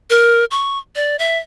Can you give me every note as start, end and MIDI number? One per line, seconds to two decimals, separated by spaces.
0.10 0.45 70
0.51 0.78 85
0.96 1.16 74
1.19 1.38 76